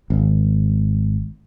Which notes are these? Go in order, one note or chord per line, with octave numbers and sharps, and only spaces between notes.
G#1